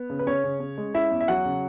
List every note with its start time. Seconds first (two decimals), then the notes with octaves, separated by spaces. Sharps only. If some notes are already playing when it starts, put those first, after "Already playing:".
Already playing: B3
0.10 C#3
0.19 B4
0.27 C#3 C#4 C#5
0.44 C#3
0.60 C#4
0.78 G#3
0.94 C#4 E4 E5
1.11 E2
1.20 E5
1.28 F#3 F#4 F#5
1.45 C#3